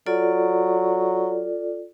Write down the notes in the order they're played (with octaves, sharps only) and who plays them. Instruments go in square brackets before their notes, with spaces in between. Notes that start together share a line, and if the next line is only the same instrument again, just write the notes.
[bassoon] F#3 [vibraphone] F4 A4 D5